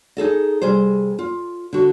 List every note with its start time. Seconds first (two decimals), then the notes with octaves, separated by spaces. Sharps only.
0.17 D#4 G#4 A4 D#5
0.62 C3 G3 G#4 C5
1.19 F4
1.73 D3 F#4